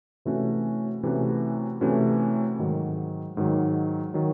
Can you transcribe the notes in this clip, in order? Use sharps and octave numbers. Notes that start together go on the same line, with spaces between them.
C3 E3 A3 C#4 F#4
C3 E3 A3 C#4 F#4
C3 E3 A3 C#4 F#4
G#2 D#3 F#3
G#2 D#3 F#3
D#3 F#3